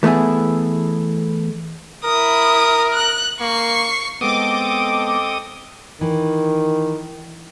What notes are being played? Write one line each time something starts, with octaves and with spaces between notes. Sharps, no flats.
E3 A3 B3 E4 G#4
E4 A#4 D#6
F#6
A#3 C#6 C7
G#3 B3 C4 A4 D#5 D6 D#6
D#3 E3